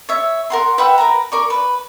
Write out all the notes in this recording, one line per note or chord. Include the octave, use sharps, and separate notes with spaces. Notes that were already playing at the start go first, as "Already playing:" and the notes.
C#5 E5
A#4 F#5 C6
B4 E5 F#5 G5
A#4 B4 A#5
A#4 D5 C#6
B4